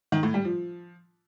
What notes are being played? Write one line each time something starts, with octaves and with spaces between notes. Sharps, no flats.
D#3
A2
G3
F3